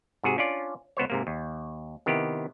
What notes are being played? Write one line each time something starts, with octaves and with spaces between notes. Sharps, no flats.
G#2 C3 F#4 G#4
C#4 D4 F4 D5
C#2 B3 C5 C#5
G#2 C3 A#3
D#2
C3 D#3 B3 E4 G4